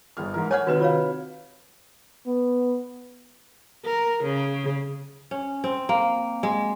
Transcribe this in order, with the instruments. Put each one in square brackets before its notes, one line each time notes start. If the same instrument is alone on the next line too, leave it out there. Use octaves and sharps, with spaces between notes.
[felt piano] G1 G#4 F6
G#2 E3 A#4
[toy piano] C#5 F#5 [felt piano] G#5 F6 G#6
[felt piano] C3 D#3 [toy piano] F#4 B4 D#5
[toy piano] F4 C#5 F5
[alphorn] B3
[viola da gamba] A#4
C#3
[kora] C#4
C4
A#3
G#3